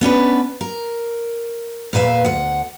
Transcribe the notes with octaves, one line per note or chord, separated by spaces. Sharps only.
B3 C#4 D4 B4
A#4
E2 A#2 B4 E5 F5
D2 F#5